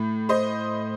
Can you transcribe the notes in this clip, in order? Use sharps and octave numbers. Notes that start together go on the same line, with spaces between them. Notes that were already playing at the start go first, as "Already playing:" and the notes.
Already playing: A2
C5 D#5